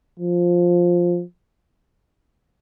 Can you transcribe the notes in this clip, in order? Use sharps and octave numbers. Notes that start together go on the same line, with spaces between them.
F3